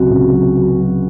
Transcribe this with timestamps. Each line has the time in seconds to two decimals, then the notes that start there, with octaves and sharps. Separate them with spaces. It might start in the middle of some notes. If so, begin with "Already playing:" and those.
Already playing: C#2 C3 F#3 F#4
0.10 C#2
0.32 F#3
0.55 F#3
0.78 F#3